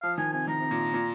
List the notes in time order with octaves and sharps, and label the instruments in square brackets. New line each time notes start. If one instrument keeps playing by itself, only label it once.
[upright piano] F3 [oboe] F5
[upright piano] D#3 [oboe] G#5
[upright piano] C3 [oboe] G#5
[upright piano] D#3 [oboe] A#5
[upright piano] C3
A#2
A#2